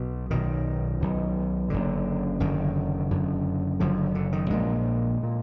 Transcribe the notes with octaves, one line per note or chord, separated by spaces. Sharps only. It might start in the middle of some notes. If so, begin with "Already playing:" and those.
Already playing: B1 B2
B1 B2 D#3
B1 B2
F#1 F#2 D3
F#1 F#2 D3 D#3
F#1 F#2 D3
F#1 F#2 D3 F3
D3
D#3
A#1 A#2 G#3
A#2